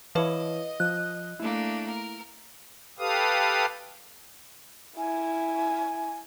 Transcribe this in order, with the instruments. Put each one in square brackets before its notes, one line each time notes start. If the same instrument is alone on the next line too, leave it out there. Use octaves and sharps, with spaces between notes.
[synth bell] E3 B4 [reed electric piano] E4 C#5 F5 [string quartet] D#5
[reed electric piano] F3 [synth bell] F#6
[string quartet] A3 A#3 D4 [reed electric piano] E4
[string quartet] A#4
[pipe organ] G4 A4 B4 F5 D#6
[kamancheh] E4 [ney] G#5